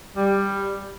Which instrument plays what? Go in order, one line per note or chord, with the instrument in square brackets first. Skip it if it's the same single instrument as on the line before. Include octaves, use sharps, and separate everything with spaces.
[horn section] G3